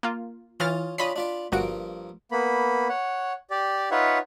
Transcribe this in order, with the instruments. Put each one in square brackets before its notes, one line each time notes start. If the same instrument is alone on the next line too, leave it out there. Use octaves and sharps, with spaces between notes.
[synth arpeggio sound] A#3 F4
[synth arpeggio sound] E3 F6 A6 [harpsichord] C#4 F4 D#6
[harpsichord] C#4 D4 F4 [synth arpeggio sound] D#5 B5 B6
[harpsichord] D4 F4 D5
[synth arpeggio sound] G1 F#4 D7 [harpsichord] G2 F3 A#3
[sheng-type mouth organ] A#3 B3 B5
C#5 F#5
G4 D5
D#4 F4 B4 C#5 E5 F#5